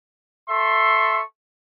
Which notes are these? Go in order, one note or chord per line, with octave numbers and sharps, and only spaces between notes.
A4 E5 C6 C#6